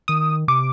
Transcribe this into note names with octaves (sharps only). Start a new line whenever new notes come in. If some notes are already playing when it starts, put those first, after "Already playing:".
D#3 D#6
C3 D6